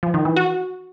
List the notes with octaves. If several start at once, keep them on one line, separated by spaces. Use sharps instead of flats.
F3
D#3
E3
F#4